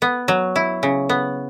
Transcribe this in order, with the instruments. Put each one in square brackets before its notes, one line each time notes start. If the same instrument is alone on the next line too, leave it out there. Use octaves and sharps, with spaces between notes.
[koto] B3
F#3
E4
C#3
B3